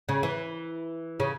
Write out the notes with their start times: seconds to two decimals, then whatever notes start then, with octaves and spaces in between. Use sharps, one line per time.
0.09 C#3
0.23 E3
1.20 C#3